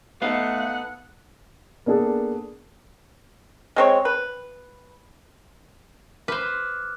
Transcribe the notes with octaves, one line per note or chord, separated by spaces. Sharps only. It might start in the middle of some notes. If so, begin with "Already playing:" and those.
A3 B3 D#4 A4 F5 F#5
A#3 B3 D4 G#4 A4
G#3 C4 C#5
B4
B4 C5 D6 F6 F#6